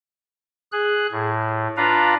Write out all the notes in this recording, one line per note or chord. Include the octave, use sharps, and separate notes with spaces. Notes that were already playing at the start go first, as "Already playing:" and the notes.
G#4 F#6
A2
D4 F4 B4 F5 A#5